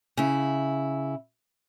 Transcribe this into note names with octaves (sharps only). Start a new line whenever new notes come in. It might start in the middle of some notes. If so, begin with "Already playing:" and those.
C#3 E4